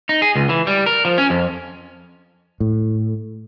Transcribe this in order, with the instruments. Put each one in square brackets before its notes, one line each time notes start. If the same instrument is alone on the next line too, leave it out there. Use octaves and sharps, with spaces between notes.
[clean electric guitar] D#4
G#4
C#2
E3
G3
A#4
F3
C#4
F2
[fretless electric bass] A2